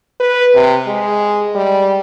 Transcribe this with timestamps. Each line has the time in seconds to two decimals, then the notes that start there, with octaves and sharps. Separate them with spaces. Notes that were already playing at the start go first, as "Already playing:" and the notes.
0.20 B4
0.55 C3
0.87 G#3
1.55 G3